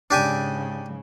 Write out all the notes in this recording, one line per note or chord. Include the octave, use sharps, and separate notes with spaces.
G#2 C#3 D4 G4 G#5